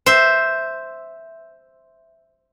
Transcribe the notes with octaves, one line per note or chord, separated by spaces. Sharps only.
C5 E5